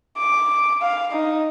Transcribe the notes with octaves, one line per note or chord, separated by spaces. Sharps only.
D6
F5
D#4